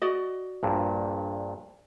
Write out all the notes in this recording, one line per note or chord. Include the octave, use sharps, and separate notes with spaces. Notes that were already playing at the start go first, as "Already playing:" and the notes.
F#4 D5 D#5
A#1 G2 A#2